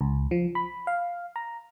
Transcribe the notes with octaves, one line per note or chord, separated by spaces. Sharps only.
C#2
F3
B5
F5
A#5